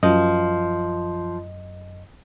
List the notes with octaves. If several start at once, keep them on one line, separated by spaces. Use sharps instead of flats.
F#2 F3 D#5